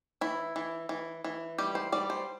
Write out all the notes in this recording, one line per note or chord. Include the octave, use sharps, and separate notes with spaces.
E3 E4
E3
E3
E3
G3 G4
C5
G3 D5
C5